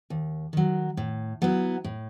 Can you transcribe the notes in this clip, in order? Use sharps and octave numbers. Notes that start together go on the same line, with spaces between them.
D#2
D#3 F#3
A2
F#3 B3 E4
A2